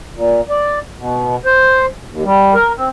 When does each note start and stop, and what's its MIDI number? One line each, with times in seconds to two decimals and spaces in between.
0.14 0.41 46
0.50 0.79 74
0.97 1.36 47
1.45 1.86 72
2.08 2.23 39
2.24 2.54 55
2.54 2.72 70
2.77 2.89 60